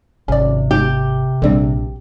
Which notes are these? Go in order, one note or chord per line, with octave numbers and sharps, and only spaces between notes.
G#1 C3 C#4 D5
G4
A#1 D3 G3 C4 D4